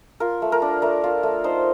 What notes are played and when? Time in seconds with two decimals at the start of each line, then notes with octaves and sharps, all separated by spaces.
0.20 F4 A#4
0.42 A3
0.52 A#4
0.62 D4
0.82 A3 A#4
1.04 F4
1.23 A3
1.44 D#4 C5